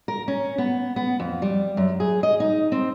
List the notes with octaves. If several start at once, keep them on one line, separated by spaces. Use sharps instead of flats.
A#4
C#4
B3
B3
F2
G3
F#2
G#4
D#5
D#4
C4